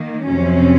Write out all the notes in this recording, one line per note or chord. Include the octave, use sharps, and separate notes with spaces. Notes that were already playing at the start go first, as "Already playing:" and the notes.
Already playing: D#3 A#3
F2 C3 F#3 C#4